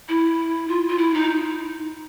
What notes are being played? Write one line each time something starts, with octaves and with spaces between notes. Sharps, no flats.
E4
F4
F4
E4
D#4